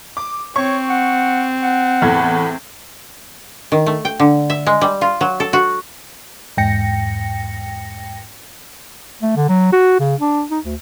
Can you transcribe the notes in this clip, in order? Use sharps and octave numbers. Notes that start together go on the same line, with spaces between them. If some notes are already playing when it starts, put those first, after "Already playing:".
D6
C4 C#5 C#6
F#5
F#5
E2 A2 G#6
D#3
A3
G5
D3
E5
G#3
G3
F4
F#3
A4
F#4
E2 G#2 G5 A#6 C#7
A3
D3
F#3
F#4
C#3
D4
D#4
D2